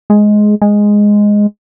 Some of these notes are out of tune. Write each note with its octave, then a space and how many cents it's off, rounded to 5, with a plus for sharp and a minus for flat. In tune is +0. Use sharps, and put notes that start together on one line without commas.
G#3 +10
G#3 -5